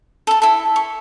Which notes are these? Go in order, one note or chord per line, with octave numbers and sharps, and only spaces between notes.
A4 A5
E4 A4
C#6